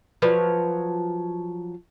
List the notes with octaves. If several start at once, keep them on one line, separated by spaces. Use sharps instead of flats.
F3 F#3 B4